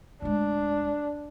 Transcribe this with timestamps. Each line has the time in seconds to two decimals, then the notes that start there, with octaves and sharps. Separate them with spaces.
0.22 D1 G#3 D4